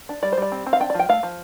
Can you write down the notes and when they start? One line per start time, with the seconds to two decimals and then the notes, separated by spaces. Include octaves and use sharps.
0.09 D4
0.23 G3 D5
0.32 C5
0.37 G3 D5
0.52 C4
0.66 C4
0.73 F5
0.80 D4 G5
0.90 D5
0.94 F3 G5
1.09 A3 F5
1.23 F3